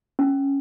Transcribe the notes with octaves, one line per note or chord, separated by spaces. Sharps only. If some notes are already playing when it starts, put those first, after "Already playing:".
C#4